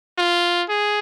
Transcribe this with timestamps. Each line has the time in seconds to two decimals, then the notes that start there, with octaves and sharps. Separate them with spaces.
0.18 F4
0.69 G#4